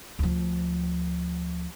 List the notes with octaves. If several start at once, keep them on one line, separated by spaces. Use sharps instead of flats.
D2 F3